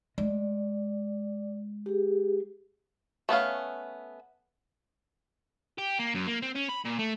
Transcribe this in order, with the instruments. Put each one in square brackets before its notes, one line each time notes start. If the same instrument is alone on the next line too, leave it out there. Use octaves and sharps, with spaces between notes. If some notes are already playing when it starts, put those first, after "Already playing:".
[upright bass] G#3 [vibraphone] D5
[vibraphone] G4 G#4
[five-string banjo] A3 B3 C#4 F5
[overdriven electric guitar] G4
A#3
F#2
A#3
C4
C#4
B5
A#2
A3